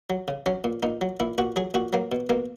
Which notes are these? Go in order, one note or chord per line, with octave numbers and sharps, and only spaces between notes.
F#3
C#3
F#3 C#4
A#2
A#2 D#4
F#3
A#2 E4
A#2 F#4
F#3 G#4
A#2 F#4
F#3 A#3
B2
B2 A#3